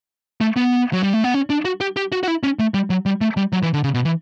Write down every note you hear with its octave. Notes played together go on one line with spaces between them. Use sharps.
A3
B3
F#3
G3
A3
B3
C#4
D4
F#4
G4
G4
F#4
F#4
E4
C#4
A3
G3
F#3
G3
A3
G3
F#3
E3
D3
C#3
B2
E3